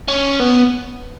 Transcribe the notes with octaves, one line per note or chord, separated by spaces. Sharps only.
C#4
B3